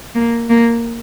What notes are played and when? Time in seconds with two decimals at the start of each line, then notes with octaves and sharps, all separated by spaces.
0.15 A#3
0.50 A#3